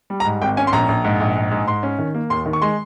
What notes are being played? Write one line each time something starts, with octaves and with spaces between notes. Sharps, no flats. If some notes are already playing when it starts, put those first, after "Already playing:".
G3
A#5
G#2
G#1 G5
C#4 G#5
C6
A#1 A#5
A#1
G#2
A#1
G#2
G#2
G#2 C6
C#4
D#3
A#3
D#2 C6
D#3
C#6
G#3 C6